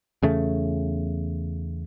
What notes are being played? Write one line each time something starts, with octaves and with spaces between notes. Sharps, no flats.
E2 C#3 A3